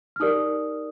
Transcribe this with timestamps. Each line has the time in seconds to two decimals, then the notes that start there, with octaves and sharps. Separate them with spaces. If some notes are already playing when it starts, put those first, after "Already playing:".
0.16 F6
0.20 D#4 G4 A#4 D5 D#6